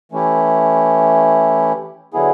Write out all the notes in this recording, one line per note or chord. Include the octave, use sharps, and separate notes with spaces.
E3 A3 C#4 E4 G4
D3 F#3 B3 E4 G#4